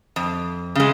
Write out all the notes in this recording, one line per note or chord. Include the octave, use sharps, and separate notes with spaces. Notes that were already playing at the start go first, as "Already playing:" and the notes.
F2
C#3 G#3